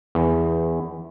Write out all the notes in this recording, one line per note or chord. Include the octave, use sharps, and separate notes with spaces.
E2